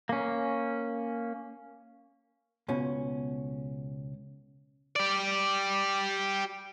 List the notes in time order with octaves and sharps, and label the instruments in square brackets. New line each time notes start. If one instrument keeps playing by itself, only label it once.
[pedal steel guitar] A#3 C#4
[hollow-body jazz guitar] C#2 B2 C#4
[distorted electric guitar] G4 D5